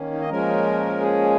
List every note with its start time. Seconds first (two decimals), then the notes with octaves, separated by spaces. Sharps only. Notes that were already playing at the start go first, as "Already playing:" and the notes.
Already playing: D#3 A#3 C#4
0.11 D#4
0.21 D#5
0.29 A#2 F3 G#3 C#4 A#4
1.00 G#4